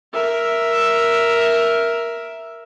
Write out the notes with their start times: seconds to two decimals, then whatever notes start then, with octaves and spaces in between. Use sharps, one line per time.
0.14 A#4 E5